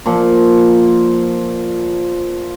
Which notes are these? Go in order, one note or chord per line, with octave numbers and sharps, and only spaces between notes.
A#2 F3